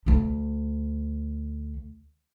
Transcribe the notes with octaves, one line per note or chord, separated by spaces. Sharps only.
D2 A3